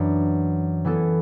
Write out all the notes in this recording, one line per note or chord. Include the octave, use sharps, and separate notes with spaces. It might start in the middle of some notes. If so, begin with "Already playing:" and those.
Already playing: F#2 E3 D4
E3 B3 E4 A4